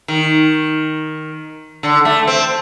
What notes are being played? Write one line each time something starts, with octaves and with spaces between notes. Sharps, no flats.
D#3
D3
A3
C4